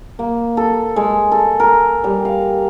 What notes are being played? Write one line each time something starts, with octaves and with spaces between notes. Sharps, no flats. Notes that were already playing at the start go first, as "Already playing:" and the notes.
A#3
A4
G#3
A4
A#4
G3
F5